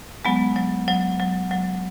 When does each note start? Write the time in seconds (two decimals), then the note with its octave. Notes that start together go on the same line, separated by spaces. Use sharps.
0.25 F#3 G#3 B3
0.56 F#3
0.88 F#3
1.20 F#3
1.51 F#3